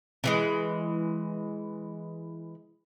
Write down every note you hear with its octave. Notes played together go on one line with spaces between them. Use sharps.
D3 E3 G#3